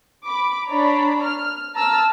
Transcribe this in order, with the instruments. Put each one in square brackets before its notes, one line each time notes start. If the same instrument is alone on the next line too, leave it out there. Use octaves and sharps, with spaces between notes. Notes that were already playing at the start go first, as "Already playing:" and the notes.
[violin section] B5 D6
D4 C#5 D5 A#5 B5
F6
A5 A#5 E6 F6